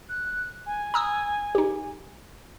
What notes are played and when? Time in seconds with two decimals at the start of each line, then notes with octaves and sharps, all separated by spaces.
0.09 F#6
0.66 G#5
0.94 A#5 D#6 E6
1.55 D#4 G4